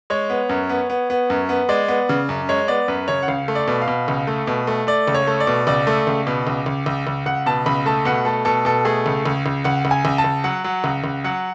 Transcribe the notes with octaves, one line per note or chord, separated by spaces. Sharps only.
G#3 C#5
B3
F#2
B3
B3
B3
F#2
B3
G#3 D5
B3
C#3
F#2
G#3 C#5
B3 D5
F#2 B4
C#3 C#5
F#5
C#2 F5
A3
D5
B2
F5
B2
C#2
A3
B2
A3
A3 D5
C#2
C#5
A3
D5
B2
C#2 D5
A3
C#2
B2
C#2
C#2
C#2
C#2
C#2 F#5
B2 A5
C#2 B5
A3 A5
B2 F#5
A3 A4
B2 A4
B2 A4
A3 G#4
C#2
C#2
C#2
C#2 F#5
C#2
G#5
C#2
A5
C#2
F#3 F#5
F#3
C#2
C#2
F#3 F#5